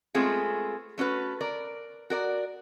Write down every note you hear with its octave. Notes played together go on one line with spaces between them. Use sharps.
G#3 A3 B3 C4 F4 G#4
A3 C#4 F#4 B4
A#4 D5
F#4 A#4 D5